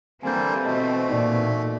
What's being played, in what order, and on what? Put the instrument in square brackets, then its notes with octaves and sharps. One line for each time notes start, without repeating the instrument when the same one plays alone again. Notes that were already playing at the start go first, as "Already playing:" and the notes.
[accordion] D3 G3 A#3 [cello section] E3 C4 [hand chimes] G#5 G6
[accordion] B2 A3 [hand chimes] D#5 A5
[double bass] A#2 [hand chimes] D#4 C5 D5